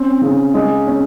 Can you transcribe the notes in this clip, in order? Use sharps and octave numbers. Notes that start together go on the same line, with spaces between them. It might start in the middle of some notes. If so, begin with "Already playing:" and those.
Already playing: C4 C#4
C#3
G#3
C#4